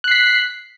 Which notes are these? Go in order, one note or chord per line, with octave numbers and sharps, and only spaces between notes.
F#6 B6 C7